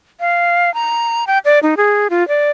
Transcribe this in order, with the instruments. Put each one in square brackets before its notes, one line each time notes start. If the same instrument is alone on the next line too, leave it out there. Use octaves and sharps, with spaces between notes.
[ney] F5
A#5
G5
D5
D#4
G#4
F4
D5